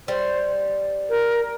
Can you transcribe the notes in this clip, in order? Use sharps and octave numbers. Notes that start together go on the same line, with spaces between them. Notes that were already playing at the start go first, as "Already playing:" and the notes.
G3 C5
A#4